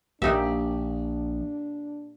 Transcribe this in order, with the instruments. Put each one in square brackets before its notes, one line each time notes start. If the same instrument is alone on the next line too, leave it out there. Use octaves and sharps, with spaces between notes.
[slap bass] A#1 [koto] A#2 D#4 E5 [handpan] A#3 G4 [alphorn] D4